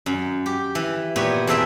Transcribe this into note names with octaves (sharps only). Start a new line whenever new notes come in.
F#2
G4
E3
A#2 B3 F#4 G4 C#5
E2 E3 C4 A4 E5 G5